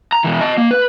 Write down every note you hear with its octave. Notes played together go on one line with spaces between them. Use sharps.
A#5
B2 E3
D#5 A5
A#3
B4